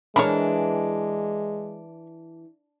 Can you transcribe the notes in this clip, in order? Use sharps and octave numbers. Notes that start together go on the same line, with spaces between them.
E3 G#3 D4 A#4 C#5 A#5 B5